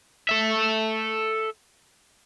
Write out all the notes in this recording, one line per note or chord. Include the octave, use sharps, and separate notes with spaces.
A4 E5